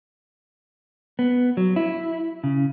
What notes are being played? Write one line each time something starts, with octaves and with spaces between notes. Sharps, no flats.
B3
F#3
E4
C#3